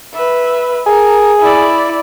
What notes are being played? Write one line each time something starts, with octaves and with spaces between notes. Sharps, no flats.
B4 E5
G#4 A#4
E4 D5